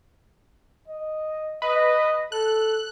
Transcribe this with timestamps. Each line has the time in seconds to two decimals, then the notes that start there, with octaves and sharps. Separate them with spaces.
0.88 D#5
1.62 B4 D#5
2.32 A4 F#6